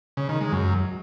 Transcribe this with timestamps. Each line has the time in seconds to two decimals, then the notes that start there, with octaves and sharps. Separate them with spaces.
0.17 C#3
0.29 D#3
0.41 G#3
0.52 F#2